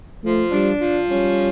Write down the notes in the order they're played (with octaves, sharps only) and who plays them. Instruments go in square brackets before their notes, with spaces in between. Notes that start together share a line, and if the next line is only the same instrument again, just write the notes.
[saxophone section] F3 [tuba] A3
[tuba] G3 [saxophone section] D4
[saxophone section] F3
[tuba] G3 [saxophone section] C#4